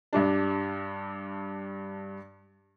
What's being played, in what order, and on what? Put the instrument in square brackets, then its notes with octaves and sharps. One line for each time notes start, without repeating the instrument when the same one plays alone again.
[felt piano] G2 G3 D4